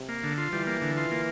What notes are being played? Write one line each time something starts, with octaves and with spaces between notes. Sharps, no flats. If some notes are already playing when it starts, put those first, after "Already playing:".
Already playing: C3
A#3
D3
F4
E3 G3
A#3
D3
F4
A#3